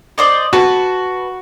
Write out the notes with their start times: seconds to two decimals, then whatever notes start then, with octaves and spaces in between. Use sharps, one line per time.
0.18 C5 D5 D#5
0.53 F#4 B4 A5